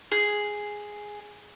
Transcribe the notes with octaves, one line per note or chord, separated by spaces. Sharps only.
G#4